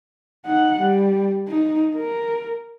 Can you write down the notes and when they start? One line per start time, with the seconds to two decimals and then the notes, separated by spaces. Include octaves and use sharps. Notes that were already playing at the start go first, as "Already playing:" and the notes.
0.46 D#4 F#5
0.80 G3
1.48 D#4
1.95 A#4